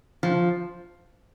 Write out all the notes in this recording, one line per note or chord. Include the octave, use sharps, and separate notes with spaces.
F3